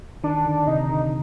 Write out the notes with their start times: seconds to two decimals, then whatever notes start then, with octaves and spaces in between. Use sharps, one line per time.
0.24 D#3 D4
0.46 D3
0.67 C3 D#4
0.90 D3